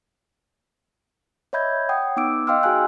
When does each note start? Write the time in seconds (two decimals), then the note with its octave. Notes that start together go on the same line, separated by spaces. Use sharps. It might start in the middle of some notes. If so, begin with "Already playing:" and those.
1.53 C#5 D#5 E5 B5 G6 G#6
1.89 F#5 G5 D#6
2.17 B3 D#4 D6 E6 D7
2.47 D#5 F5 G5 C6 E6 F6
2.63 F#4 G#4 D#5 F5 G#5 F#6